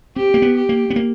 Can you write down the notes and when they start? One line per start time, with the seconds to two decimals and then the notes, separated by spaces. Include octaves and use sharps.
0.16 C4 G4
0.34 A#3
0.42 B3
0.56 G4
0.69 A#3
0.90 B3
0.96 A#3